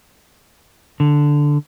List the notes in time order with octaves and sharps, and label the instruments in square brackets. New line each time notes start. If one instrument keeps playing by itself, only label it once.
[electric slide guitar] D3